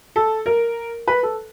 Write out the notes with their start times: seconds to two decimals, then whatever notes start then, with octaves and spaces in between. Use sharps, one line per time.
0.16 A4
0.46 A#4
1.07 B4
1.23 A4